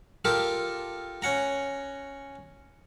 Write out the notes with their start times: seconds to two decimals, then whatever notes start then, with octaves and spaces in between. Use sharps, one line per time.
0.25 F4 G4 A4 A#4
1.22 C#4 F#5 A#5